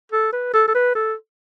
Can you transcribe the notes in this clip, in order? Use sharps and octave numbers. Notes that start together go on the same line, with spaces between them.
A4
B4
A4
A4
B4
A4